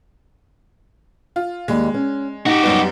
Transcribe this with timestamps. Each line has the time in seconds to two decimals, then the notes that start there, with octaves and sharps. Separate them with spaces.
1.36 F4
1.68 D#2 G3 G#3
1.94 C#4
2.46 D#4 F#4 G4
2.63 F#2 G3 B3